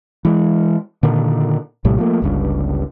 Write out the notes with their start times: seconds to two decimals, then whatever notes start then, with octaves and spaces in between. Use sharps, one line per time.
0.25 E3 G#3
1.03 A#2 D3 D#3
1.85 A#1 A2 C3 G3
1.98 F3 A3 A#3
2.22 G1 C#2 G2